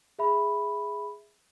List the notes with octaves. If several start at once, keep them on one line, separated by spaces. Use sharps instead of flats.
G#4 E5 B5